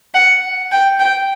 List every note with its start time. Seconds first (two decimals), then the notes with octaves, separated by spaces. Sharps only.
0.14 F#5
0.72 G5
1.00 G5